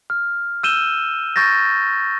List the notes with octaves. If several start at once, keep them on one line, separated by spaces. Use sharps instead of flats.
F6
E6 G6 D#7 E7 G7
C#6 G6 A6 A#6